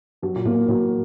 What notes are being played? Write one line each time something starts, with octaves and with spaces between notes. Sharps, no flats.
G2 F#3
A#2
A2 A#3
A2 F#3